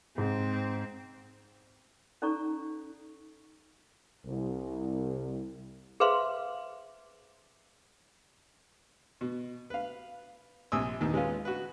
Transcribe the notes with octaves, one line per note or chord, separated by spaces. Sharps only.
G#2 C4
C#4 D#4 A4 D5 A#5 C#6
C2
G#4 B4 C5 E5 F5 C6
B2
B4 F5
A#1 C3 G#5 D#6 E6
D#2 D#3 E3
G#3 B3 C#4 F4
F#4 B4